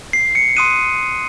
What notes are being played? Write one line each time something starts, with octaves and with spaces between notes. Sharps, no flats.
C7
C#7
C6 D#6 F#6 D#7